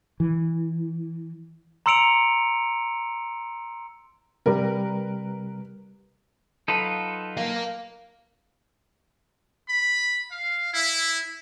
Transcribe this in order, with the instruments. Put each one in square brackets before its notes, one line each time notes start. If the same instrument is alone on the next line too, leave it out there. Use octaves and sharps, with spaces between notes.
[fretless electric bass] E3
[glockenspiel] A#5 C6 E6 C#7 D7 F7
[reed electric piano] C3 G3 [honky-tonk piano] A#4 B4
[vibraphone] F#3 [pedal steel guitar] D#4 F4 B4 [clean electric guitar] A4
[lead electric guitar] A#4 F5
[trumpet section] B5
F5
E4